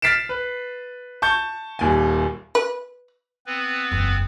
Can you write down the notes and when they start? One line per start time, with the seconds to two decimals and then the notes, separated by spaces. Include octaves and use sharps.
0.02 F6 A6 B6 C7 D7 E7
0.29 B4
1.22 A5 C#6 G6
1.79 D#1 D#2 G#5
2.55 B4
3.46 B3 C4 B4
3.91 F#1 E2